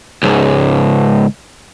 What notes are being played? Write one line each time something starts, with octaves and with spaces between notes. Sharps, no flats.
C#2 G#2